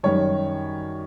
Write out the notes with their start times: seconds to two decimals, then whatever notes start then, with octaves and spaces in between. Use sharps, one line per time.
0.04 F#2 D#3 G3 C#5